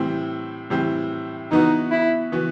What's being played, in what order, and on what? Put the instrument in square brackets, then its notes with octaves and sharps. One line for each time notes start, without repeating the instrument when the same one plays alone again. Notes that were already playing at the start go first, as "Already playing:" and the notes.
Already playing: [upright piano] A2 E3 G3 C4
A2 E3 G3 C4
[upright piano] E3 B3 F#4 [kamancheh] D#4
[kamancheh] E4
[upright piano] E3 B3 F#4